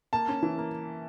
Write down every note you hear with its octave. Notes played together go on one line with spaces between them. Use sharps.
A#3 A5
C#4
E3
A#3